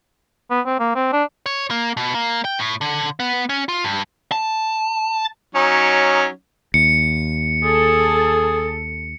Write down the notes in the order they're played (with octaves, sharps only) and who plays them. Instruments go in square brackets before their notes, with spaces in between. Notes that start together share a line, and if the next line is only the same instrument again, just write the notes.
[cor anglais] B3
C4
A#3
C4
D4
[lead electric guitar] C#5
A#3
B2
A#3
G5
A2
D3
B3
C#4
F4
G2
A5
[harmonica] F#3 C#4 D#4
[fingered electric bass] D#2 [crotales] C#7
[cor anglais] G#4 [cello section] A4